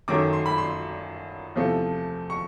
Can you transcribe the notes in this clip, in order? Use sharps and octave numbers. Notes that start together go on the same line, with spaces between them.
F#2 D#3 F#3 A3 D6
C6
B5
C6
E2 C3 F3 A3
C#6